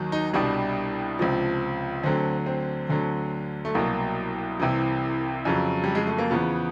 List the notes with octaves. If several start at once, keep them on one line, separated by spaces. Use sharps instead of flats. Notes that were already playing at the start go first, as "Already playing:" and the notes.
Already playing: D#2 D#3 F#3
D#4
C2 B2 G3 D4
C#2 C3 F3
D2 D3 F#3 C4
C4
D2 D3 F#3
A3
C2 B2 F#3 A#3
C2 C3 E3
F2 C#3 F#3
G3
G#3
A3
A#3
E2 C#3 F3 B3